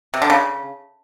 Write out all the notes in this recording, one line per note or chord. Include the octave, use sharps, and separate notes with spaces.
C3
D3
C#3